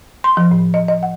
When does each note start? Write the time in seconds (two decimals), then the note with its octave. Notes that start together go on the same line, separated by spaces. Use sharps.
0.24 C6
0.37 F3
0.51 A2
0.74 D#5
0.88 D#5
1.03 F#5